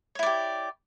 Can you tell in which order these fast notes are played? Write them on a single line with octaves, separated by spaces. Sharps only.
C#5 E4 D5 G4